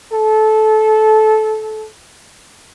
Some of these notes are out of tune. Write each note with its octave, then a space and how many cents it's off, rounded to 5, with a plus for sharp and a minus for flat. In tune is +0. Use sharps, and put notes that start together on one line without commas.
A4 -20